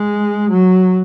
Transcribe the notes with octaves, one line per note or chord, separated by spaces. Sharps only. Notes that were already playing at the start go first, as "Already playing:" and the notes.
Already playing: G#3
F#3